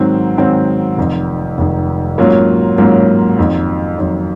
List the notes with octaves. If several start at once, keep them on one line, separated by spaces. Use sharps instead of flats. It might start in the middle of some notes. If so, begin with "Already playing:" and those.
Already playing: G#2 D#3 F#3 C4
G#2 D#3 F#3 C4
F1 F2 D#3
F1 F2 D#3
G#2 F#3 A#3 C#4 F4
G#2 F#3 A#3 C#4 F4
F2 D#3 F#3
F2 D#3 F#3